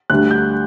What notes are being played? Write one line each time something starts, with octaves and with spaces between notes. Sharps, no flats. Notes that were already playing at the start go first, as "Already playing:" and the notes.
D2 D3 G3 F#6
G6